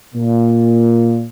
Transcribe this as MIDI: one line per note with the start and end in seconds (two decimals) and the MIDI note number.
0.14 1.25 46